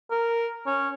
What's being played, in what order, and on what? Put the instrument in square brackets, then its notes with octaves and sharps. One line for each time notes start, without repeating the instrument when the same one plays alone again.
[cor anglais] A#4
C#4